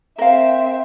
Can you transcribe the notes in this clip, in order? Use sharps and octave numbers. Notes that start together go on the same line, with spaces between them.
C4 A#4 E5 F5